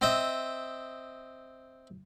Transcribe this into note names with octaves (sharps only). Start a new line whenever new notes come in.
C4 D#5 E5